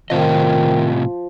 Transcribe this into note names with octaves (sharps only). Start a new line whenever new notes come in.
A2 C3 D#3 F3 D#5